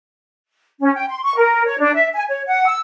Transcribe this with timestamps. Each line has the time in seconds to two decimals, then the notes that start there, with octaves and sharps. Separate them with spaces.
0.80 C#4
0.95 G5
1.08 C6
1.23 C#6
1.37 A#4
1.66 C#5
1.79 D4
1.94 E5
2.14 G#5
2.28 C#5
2.47 F#5
2.67 E6